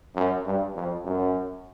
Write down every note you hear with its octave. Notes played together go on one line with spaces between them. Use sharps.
F#2
G2
F2
F#2